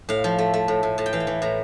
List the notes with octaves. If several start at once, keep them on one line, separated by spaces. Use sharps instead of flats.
A2 F5
F3
A3
A3
A2
A2
A2 A5
G5
E3 F5
G5
E3
A2 A#5